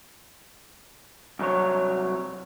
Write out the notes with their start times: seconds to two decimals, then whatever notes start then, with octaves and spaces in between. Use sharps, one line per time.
1.39 C2 F#3 C#5